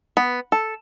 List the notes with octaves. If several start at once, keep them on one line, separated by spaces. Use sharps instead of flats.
B3
A4